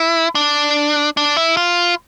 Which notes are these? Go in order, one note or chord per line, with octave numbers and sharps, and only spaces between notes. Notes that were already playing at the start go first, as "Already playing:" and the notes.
Already playing: E4
D4
D4
E4
F4